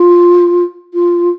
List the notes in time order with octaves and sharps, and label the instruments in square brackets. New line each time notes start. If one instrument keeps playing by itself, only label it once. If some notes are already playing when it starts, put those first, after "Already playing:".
Already playing: [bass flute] F4
F4